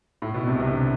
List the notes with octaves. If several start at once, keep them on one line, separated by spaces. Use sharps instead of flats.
A2
B2
C2 C3
C2 C3
D3